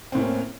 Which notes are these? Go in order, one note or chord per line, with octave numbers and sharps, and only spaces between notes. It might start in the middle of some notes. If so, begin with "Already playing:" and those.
A2 A#3 C4 C#4